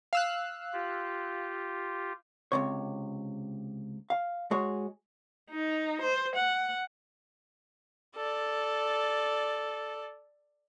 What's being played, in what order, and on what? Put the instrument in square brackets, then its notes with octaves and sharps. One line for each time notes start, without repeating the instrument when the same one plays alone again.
[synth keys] F5 E6 F#6
[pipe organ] F4 G4
[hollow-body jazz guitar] C#2 G#2 C3 C#5
F5
G#3 F#4 G#4 C#5
[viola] D#4
C5
F#5
[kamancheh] A4 D5